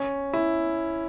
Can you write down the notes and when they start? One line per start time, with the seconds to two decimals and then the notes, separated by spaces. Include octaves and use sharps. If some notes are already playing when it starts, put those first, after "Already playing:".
Already playing: C#4
0.34 E4